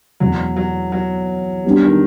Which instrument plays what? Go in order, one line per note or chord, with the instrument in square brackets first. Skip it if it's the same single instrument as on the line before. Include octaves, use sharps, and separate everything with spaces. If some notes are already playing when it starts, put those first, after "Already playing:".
[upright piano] E2 B2 G#3 [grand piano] F#3
[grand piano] F#3
F#3
[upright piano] G3 B3 D4 F#4
[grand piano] D#3